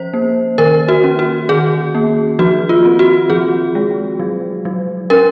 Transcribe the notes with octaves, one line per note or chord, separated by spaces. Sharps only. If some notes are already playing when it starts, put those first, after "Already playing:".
Already playing: F3 C#4 C5
A#3
D#3 A#4
F#4
C#4
F#4
D#3 G#4
A#3
F3 F#4
F4
C4
F#4
F3 G#4
G#3
F#3
F#3
C#4 A#4